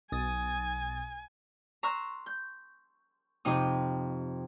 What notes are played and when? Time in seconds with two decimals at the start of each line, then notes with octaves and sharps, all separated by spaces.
0.12 B1 G#5 D#6 A6
1.83 A#5 C6 C#6 E6 F#6
2.26 G6
3.45 F2 C3 D#4 D#6